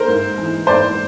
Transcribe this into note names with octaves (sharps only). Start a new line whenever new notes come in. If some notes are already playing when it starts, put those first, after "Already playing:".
Already playing: A#4 C5
G#2
E3 G#3 B3
G#2 C5 D5